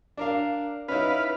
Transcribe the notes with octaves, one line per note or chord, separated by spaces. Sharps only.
D4 A#4 F5
C#4 D#4 E4 B4 F5